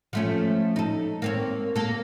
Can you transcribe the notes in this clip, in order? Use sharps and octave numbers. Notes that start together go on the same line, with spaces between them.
F3 A3 C#4
D#4 A4
A#3 C4 C#5
A#3 A4